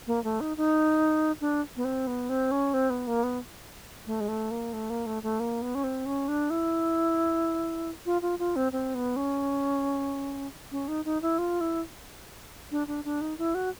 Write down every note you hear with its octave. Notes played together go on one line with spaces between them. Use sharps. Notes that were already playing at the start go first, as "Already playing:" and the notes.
A#3
A3
D#4
D#4
D4
B3
C4
B3
C4
C#4
C4
B3
A#3
B3
A3
G#3
A3
A#3
A3
A#3
A3
A3
A#3
B3
C#4
C4
C#4
D4
E4
F4
F4
F4
C4
C4
B3
C#4
C#4
D#4
D#4
E4
F4
E4
D4
D4
D4
D#4
E4
F#4